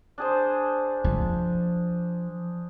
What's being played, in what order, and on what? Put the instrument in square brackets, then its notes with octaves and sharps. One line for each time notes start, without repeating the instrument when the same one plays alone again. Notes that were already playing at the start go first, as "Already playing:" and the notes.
[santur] D4 G#4 C5
[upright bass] F3